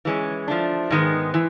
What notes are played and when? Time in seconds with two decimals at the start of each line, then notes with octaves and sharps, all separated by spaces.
0.05 E3 G#3 C#4
0.48 F3 A3 D4
0.90 G#2 D#3 G#3 B3
1.34 E3